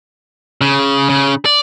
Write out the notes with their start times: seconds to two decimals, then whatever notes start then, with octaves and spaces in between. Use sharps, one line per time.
0.61 C#3
1.09 C#3
1.46 D5